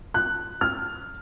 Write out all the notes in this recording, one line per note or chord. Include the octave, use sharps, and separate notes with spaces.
F#6
F6